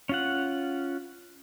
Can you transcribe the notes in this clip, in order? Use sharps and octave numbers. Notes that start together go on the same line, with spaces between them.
C#4 F4 F#5